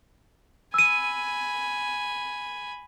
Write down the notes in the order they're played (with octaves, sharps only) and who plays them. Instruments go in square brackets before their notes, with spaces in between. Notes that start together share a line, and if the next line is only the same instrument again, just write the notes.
[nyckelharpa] G#5 B5 [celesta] E6 D#7